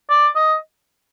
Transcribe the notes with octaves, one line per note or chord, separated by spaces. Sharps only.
D5
D#5